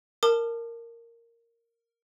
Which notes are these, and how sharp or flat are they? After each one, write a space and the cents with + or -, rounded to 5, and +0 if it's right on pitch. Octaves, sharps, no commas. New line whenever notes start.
A#4 -10 A5 +0 D6 +40